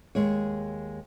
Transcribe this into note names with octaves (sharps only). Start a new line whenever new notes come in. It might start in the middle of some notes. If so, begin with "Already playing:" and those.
D#2 G#3 C#5